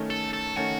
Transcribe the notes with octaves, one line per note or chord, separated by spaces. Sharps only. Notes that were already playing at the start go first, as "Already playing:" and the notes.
Already playing: D#3 A3 C#4
A4
A4
D#3 A3 C#4 F#4